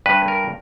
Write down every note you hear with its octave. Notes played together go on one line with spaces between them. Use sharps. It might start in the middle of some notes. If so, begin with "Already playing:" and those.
G2 B4
A#4